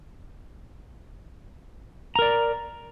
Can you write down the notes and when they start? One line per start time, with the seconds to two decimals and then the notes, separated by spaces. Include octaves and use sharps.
2.16 A#5
2.19 A#4
2.22 D5